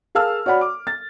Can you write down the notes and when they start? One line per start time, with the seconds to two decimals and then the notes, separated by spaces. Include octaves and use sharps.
0.15 G#4 A#4 F5 A5 E6 F6
0.46 F#4 C#5 D5 F#5 B5
0.61 D6
0.87 A6